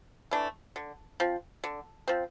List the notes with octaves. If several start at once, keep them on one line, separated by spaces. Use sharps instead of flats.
E3 A3 D4
D3
F3 C4
D3
F3 C4